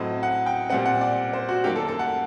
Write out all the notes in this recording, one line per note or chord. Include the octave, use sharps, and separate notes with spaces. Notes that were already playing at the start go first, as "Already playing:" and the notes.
Already playing: A2 F#3 C4 D#5
F#5
G5
A#2 G3 C4 F#5
F#5
D5
C5
F#4
F#2 D#3 G3 A#3 G4
A4
A4
F#5